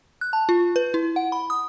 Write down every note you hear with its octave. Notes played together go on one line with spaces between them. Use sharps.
F#6
A5
F4
B4
E4
F#5
B5
D#6